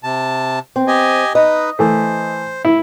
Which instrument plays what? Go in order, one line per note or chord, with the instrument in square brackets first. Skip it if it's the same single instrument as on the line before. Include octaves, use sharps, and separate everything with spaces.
[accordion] C3 A5
[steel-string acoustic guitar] C4
[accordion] G4 D#5 G#5
[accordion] D#4 B4 [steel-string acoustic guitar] D#5
[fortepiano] E3 A3 [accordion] C5
[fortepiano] E4